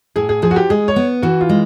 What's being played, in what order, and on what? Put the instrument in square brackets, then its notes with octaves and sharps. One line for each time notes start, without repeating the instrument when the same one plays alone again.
[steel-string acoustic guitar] A2 [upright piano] G#4
[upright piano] G#4
[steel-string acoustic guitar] F3 [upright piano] G#4
[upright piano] F#4
G4
[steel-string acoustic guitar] G#3 [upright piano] G#4
[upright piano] C#5
[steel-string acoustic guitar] B3
[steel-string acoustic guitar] E3 [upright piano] F#4
[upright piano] F4
[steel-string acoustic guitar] G#3